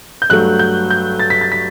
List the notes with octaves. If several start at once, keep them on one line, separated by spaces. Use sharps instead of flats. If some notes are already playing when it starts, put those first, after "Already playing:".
G6
G2 F#3 A3 F#6
G6
G6
A6
B6
A6
B6